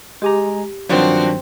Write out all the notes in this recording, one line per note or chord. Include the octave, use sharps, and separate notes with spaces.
G#3 G4 G#5 A#5 D6
G2 D#3 F3 F#3 C4 D4 F#4